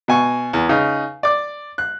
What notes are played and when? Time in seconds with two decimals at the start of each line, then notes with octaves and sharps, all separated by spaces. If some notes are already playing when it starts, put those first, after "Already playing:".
0.08 B2 G#5 C#6
0.53 E2
0.69 C#3 D#4
1.23 D5 D6
1.78 F#6